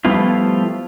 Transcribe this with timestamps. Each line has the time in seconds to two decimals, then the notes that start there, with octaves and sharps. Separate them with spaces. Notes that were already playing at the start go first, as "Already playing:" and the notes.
0.05 F3 G3 A3 B3 E4 F4